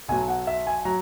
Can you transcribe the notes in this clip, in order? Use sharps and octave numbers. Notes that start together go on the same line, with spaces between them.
B1 B2 F#3 G#5
F#5
E5
G#5
F#3 A#5